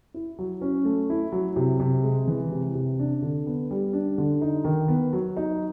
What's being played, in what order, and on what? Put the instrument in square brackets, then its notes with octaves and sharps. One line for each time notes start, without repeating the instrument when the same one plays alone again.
[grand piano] E4
F#3
C#4
A3
E4
F#3
C3
C3
G#3
E3
C3
C3
D4
D3
B3
G3
D4
D3
D#4
D#3
B3
F#3
D#4